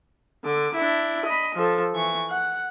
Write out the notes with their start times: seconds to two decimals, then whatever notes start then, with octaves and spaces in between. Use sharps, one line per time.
0.44 D3 D6
0.75 D4 E4
1.25 D#5 B5
1.55 F3 A4
1.94 E3 C#6
2.31 F#5